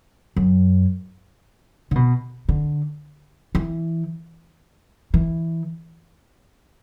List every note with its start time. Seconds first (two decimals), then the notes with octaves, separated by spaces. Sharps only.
0.36 F#2
1.91 D3
1.95 B2
2.49 D3
3.55 E3
5.14 E3